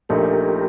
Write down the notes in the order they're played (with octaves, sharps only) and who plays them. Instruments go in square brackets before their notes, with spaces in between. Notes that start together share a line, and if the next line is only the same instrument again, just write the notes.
[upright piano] A#1 A#2 A3 D#4 [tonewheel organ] G4 A#4